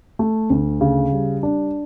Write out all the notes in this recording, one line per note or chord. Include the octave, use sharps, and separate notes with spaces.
A3
D2
C#3
G3
D4